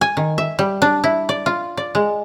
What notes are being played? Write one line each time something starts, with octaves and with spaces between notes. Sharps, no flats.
G#5
D#3
E5
G3
D4
E4
D5
F4
D5
G#3